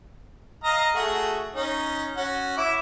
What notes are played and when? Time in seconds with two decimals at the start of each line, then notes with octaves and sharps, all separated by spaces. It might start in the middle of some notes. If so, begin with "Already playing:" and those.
0.64 D#5 F5 A#5
0.95 A3 F#4 G#4
1.54 C#4 D#4
2.16 C#4 F#4
2.57 E4 E5 D6